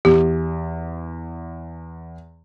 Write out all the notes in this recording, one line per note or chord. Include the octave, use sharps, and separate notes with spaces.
E2 G4